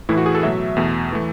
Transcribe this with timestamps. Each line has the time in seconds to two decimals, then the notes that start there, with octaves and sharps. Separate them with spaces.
0.09 A2 E3 A3 E4
0.18 F#4
0.26 G#4
0.34 A4
0.43 B2 F#3 A3 E5
0.77 E2 B2 A3
1.13 E3 A3